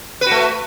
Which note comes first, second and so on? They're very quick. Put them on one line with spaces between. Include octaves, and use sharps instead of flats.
B4 F#4 A3